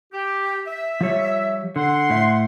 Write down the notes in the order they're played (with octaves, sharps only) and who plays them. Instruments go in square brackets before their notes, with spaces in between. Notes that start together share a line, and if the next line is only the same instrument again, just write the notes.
[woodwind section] G4
E5
[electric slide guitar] F3 G3 C#5
[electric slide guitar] D3 [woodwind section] F#5 C6
[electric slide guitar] A2 E5